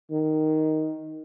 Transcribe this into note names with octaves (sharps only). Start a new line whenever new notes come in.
D#3